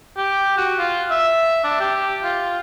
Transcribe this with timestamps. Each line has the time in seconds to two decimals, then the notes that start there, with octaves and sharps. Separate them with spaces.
0.17 G4
0.58 F#4
0.79 F4
1.11 E5
1.64 D4
1.80 G4
2.23 F4